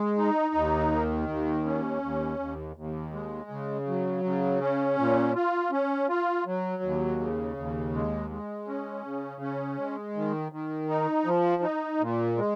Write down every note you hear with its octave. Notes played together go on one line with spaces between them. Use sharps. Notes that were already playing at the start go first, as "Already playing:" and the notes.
Already playing: G#3
D#4
D#2
D#3
D#2
C#4
D#2
D#2
D#2
G#3
C#3
F#3
C#3
C#4
A#2
F4
C#4
F4
F#3
D#2
C#3
D#2
G#3
G#3
C#4
C#3
C#4
G#3
D#3
D#3
D#4
F3
D#4
A#2
G#3